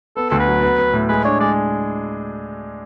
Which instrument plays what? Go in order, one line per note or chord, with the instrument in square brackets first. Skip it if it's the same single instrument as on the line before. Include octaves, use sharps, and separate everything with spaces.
[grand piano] B3 [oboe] A4
[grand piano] D2 [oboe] A4
[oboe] B4
[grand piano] F#3
B3
B3
A2
[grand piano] G#3 [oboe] B4
[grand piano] D4 [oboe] C#5
[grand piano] G#3 [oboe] D5